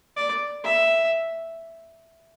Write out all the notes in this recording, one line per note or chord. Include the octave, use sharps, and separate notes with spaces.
D5
E5